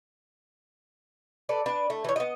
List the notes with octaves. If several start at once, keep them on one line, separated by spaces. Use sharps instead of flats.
A4 B4 D5
D4 B4
A3
E3 C#5
B3 D#5